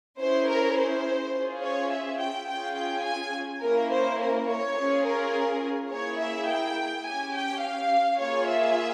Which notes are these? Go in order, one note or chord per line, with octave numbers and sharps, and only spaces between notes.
C#4 E4 G#4 C5
A#4
C5
C#4 F4 G#4
C#5
E5
G5
C#4 F4 G#4 G5
G5
G#5
A#3 C#4 E4 A#4
C5
A#4
C#5
C#4 F4 G#4
A#4
A#3 E4 G#4 C#5
E5
G5
C#4 G4 G#5
G5
F5
A#3 F4 G#4 C#5
E5